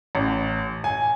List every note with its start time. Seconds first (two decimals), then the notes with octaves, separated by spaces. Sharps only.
0.15 A1
0.84 G#5